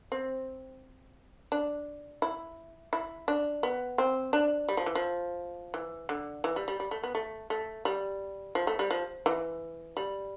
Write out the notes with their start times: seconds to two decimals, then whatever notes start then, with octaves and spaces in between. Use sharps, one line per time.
0.12 C4
1.52 D4
2.22 E4
2.93 E4
3.28 D4
3.63 B3
3.98 C4
4.33 D4
4.69 G3
4.77 F3
4.86 E3
4.95 F3
5.74 E3
6.09 D3
6.44 E3
6.56 G3
6.68 G3
6.80 G3
6.91 A3
7.04 B3
7.15 A3
7.50 A3
7.85 G3
8.55 F3
8.67 A3
8.79 G3
8.91 F3
9.26 E3
9.97 G3